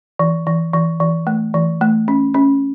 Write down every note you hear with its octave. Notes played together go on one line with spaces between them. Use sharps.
E3
E3
E3
E3
A3
E3
A3
C#4
C#4